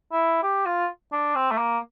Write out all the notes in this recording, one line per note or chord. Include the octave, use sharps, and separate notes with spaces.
E4
G4
F4
D4
C4
A3
A#3